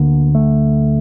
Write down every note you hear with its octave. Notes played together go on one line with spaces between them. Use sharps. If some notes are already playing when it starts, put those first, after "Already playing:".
Already playing: D2 D3 A#3
A3